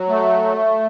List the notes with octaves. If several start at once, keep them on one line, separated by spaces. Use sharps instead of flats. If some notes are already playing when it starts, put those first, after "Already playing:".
Already playing: F#3
A3